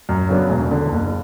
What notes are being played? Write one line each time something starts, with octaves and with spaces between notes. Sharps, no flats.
F#2
C#3 F#3 B3 D4
E1
E2 D3
F#1